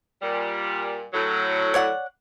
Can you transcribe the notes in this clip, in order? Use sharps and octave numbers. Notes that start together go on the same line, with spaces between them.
A#2 G3
A2 F#3
C#5 D5 F#5